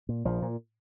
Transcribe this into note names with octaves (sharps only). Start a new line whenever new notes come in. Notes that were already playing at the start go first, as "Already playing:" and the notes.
A#2
A#1 F3
A#2